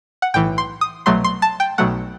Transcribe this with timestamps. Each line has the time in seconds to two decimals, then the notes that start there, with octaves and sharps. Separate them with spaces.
0.22 F#5
0.34 B1 A2 E3 G5
0.58 C6
0.81 D#6
1.06 C2 B2 F#3 A3 C6
1.24 C6
1.42 A5
1.60 G5
1.78 B1 B2 F#3 A3 F#5